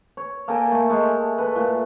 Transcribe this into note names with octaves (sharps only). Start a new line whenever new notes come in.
C#5
A#3 A4 G5 G#5
A3
G#3 A3
A4 B4
A#2 A3